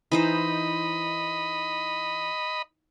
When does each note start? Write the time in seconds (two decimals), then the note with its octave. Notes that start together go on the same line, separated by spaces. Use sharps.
0.12 E3 D#4 C5 D#5 B5